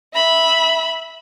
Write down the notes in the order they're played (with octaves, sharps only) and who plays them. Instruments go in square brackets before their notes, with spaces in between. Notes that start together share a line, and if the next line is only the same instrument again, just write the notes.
[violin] E5 B5